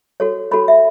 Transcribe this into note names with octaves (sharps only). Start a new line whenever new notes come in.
F#4 A4 C#5
F#4 A4 C#5 B5
E5